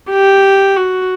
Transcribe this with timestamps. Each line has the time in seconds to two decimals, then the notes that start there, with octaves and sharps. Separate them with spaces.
0.10 G4
0.76 F#4